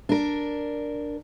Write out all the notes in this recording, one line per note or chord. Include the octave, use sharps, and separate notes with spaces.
D4 A#4